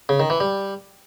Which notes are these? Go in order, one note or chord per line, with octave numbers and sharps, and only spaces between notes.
C#3
D#3
E3
G3